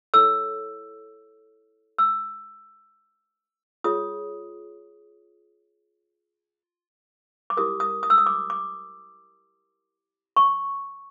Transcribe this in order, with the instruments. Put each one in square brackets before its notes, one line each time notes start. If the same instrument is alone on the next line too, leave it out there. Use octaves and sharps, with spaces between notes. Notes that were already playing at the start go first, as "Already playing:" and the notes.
[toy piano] E4 A4 C#5 E6
E6
F4 G#4 C#5 D#6
D6
E4 G4 A#4 D#6
D#6
D#6
E6
D#6
D6
D6
C#6